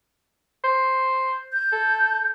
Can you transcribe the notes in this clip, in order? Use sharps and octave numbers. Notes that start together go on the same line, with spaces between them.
C5
G6
A4